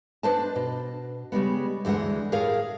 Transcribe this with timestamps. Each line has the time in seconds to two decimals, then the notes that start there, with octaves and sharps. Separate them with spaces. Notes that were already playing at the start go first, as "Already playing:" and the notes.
0.23 D4 B4 C5 D#5 A5
0.56 B2
1.32 C#3 G3 G#3 B3
1.85 D2 E3 G#3 D4 F#5
2.32 A2 G#4 A#4 C#5 F5